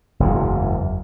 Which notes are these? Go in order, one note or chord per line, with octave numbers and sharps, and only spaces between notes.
F#1 E2 G#2